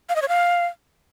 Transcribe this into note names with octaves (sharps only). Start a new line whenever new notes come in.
F5
D#5
C#5
F5